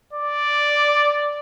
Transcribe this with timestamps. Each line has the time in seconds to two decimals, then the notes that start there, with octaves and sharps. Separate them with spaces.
0.13 D5